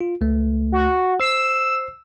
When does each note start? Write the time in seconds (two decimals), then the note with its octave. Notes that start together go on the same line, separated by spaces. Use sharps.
0.01 F4
0.21 C#2 A3
0.72 F#4
1.20 C5 E6 C7